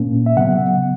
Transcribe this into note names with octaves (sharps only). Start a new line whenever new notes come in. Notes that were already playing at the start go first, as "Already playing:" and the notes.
Already playing: A#2 A#3 C#4
E5
C#3 F#3 B3 F#5